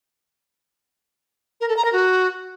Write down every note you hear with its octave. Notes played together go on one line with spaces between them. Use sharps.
A#4
A4
A#5
A#4
F#4